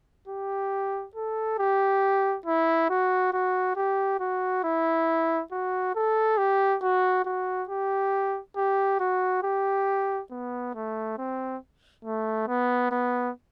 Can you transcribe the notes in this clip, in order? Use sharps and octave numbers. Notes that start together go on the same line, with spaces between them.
G4
A4
G4
E4
F#4
F#4
G4
F#4
E4
F#4
A4
G4
F#4
F#4
G4
G4
F#4
G4
B3
A3
C4
A3
B3
B3